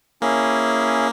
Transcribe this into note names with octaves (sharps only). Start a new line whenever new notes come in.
A#3 C#4 E4 G#4